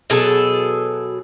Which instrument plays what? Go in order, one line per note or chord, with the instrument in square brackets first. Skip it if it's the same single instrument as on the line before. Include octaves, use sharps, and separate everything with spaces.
[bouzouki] B2 F#3 G#4 A4